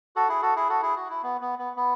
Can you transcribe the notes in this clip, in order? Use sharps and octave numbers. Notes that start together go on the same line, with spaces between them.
F#4 A4
E4 G#4
F#4 A4
E4 G#4
F#4 A4
E4 G#4
F#4
E4
B3
B3
B3
B3